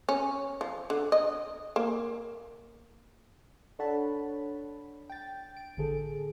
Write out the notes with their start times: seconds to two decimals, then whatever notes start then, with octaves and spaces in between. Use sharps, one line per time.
0.09 C#4
0.61 F3
0.90 D3
1.12 D#5
1.76 A#3
3.79 D4 A4 C#5 F#5 A5 B5
5.10 G5 A6
5.57 D7
5.77 A1 D3 G#4 A4